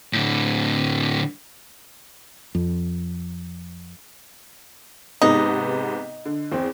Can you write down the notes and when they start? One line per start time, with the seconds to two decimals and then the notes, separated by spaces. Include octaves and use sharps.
0.13 A2 D3
2.55 F2
5.22 G#2 C3 B3 D#4
6.26 D3
6.52 E2 C4